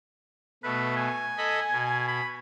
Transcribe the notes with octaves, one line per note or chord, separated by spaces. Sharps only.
B2 A3 B4
G#5
A4 D#5 B5
B2
B5